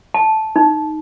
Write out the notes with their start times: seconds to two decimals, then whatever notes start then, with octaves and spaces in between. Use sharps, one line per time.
0.14 A5
0.56 D#4